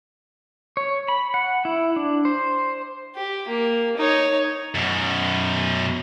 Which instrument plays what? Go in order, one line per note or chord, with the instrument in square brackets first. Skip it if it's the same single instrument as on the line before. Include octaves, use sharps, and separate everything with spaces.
[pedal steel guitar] C#5
B5
F#5
E4
D4
C5
[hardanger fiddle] G4
A#3
D#4 C#5
[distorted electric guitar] F#2 B2